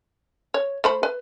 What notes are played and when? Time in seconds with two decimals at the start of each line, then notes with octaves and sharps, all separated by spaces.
0.54 C#5
0.84 A3 C5 B5
1.03 B4